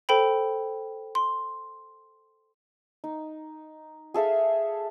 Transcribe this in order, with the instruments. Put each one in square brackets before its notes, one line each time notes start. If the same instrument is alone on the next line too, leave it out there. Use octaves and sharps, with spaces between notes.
[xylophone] A4 C5 G5 B5
C6
[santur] D#4
G#4 A4 E5 F5